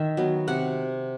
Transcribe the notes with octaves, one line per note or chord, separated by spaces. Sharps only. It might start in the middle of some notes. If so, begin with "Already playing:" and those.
Already playing: D#3 E5
F#3 B3
C3 F#5